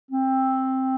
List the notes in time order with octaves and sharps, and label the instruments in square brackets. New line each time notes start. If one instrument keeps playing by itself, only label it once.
[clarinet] C4